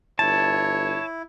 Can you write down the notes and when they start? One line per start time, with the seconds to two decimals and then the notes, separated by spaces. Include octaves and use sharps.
0.19 G1 E4 C#5 A5